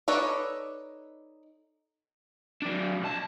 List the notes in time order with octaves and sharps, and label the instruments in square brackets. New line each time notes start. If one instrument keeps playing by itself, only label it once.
[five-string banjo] D#4 A4 B4 C#5 D5
[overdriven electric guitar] F#3 D4
B1 A5